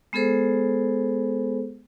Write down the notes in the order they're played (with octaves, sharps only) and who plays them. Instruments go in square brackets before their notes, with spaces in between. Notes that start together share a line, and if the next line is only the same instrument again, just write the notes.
[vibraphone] G#3 B3 G#4 A4 C5